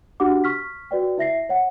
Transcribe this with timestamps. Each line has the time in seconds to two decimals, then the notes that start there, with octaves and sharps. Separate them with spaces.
0.20 D4 F#4 G4 F#5 D6
0.44 C#6 F6 B6
0.91 F#4 B4 D5 G5
1.18 E4 E5 A#6 C7
1.49 C#5 F#5